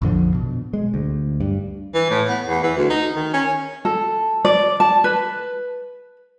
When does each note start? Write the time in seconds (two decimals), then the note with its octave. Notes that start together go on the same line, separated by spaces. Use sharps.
0.02 A#1 F2 D3 F3
0.35 B2
0.73 G#3
0.94 D2
1.40 G2
1.94 E3
2.11 A2
2.28 B3
2.47 E2
2.63 E3
2.77 D2
2.90 D#4
3.16 D#3
3.33 C#4
3.85 A4
4.45 D5
4.80 A5
5.04 B4